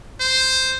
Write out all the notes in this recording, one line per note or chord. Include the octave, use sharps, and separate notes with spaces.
C5